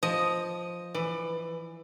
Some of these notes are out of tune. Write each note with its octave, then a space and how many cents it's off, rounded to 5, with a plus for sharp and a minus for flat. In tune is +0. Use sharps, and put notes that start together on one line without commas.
F3 +0 D#5 +0
E3 +0 D5 +35